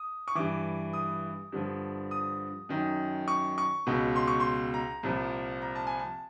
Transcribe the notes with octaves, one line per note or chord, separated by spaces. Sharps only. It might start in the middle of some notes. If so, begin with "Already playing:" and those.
Already playing: D#6
C#6
G2 E3 D6
D#6
G2 D3 F3
D#6
F#2 D#3
C#6
C#6
C#2 B2
C6
C#6
C6
A#5
C2 A#2 F3
A#5
A5
G#5
A5